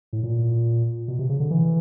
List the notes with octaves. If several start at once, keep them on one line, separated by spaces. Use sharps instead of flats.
A2
A#2
B2
C3
C#3
D3
E3